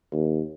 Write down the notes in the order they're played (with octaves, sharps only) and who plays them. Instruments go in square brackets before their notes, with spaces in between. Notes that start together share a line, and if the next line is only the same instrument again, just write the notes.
[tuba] D#2